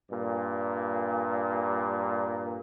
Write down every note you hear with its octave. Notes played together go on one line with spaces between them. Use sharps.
G2 A#2